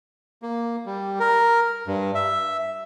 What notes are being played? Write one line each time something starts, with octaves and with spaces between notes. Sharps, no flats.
A#3
G3
A#4
G2
E5